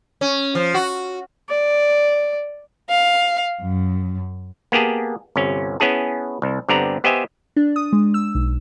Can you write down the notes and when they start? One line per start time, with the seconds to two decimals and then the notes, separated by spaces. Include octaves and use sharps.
0.21 C#4
0.55 F3
0.74 F#4
1.50 D5
2.89 F5
3.61 F#2
4.72 A#3 B3 G4 G#4 A5
5.36 G1 C3 C#4
5.80 B3 C#4 E4 G#4 A5
6.42 C2
6.69 G2 D3 B3 C4 D5 A#5
7.04 B3 G4 C5 D#5 E5 G#5
7.57 D4
7.76 D#6
7.93 G#3
8.14 E6
8.35 B1